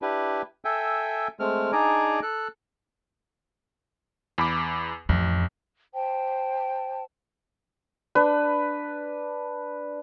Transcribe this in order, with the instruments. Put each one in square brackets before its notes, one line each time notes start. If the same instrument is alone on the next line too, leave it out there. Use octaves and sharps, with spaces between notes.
[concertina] D4 E4 G4 B4
A4 E5 G5 G#5
G#3 A3 C4 F6
D4 D#4 G#4 D5 G#5 A#5
A4 F#6
[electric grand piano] E2 B5 D6
[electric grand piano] A1 [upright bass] F2
[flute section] C5 G5 A5
[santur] D4 B4